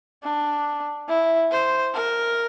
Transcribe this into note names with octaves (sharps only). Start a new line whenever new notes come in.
D4
E4
C5
A#4